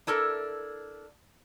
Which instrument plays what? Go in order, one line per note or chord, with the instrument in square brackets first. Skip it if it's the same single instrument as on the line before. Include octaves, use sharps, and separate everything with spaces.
[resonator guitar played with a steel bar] D4 E4 A4 A#4